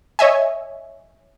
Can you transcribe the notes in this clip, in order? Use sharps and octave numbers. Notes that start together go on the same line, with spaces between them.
C#5 D#5 E5 G#5